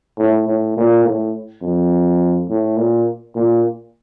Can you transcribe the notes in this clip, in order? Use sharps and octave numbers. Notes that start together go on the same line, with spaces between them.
A2
A2
A#2
A2
F2
A2
A#2
A#2